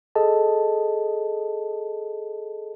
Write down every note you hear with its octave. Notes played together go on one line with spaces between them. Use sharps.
G#4 A4 D#5 A5